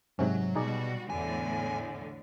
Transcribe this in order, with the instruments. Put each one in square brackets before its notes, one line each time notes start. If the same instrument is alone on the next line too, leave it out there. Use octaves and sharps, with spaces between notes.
[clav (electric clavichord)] G#2 C3 C#4 [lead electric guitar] F#3
[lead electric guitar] B2 [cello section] G3 F#4 [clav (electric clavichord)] D#4 G#4 D5
[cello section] E2 A2 D3 [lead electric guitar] G#5